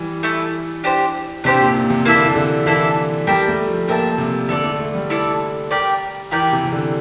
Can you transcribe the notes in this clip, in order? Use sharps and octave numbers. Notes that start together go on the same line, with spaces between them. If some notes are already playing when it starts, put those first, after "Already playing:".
Already playing: E3 G3
A3 E4 A4
D4 G4 C5
C3 D4 G4 C5
A#2
A#2
C3
E3 A#3 E4 A4 E5
D3
C3
D3
E3 A#3 E4 A4 E5
G3 G4 A#4 E5 A5
A3
F3
A#2 G4 A#4 E5 A5
C3
D3 E4 A4 D5
A3
A3
G3
E4 A4 D5
G4 A#4 D5 G5
E3 G4 A#4 D5 G5
C3
C3
D3